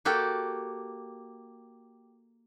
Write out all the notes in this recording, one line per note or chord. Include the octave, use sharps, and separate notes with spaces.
A#3 F#4 G4 A4